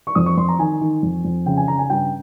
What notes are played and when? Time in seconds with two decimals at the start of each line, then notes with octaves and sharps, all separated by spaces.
0.07 C#6
0.15 F2 D#6
0.26 C#6
0.37 F2 C6
0.48 A#5
0.59 D#3 G#5
0.81 D#3
1.03 F2
1.25 F2
1.46 C#3 G5
1.57 G#5
1.68 C#3 A#5
1.79 G#5
1.90 G2 G5